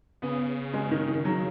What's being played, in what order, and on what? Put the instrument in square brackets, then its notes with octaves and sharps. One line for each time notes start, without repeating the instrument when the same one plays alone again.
[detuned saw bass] C#3 [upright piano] B3
[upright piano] G#3
D#3
D#3
F#3